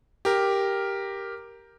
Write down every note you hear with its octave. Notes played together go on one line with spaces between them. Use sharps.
G4 A#4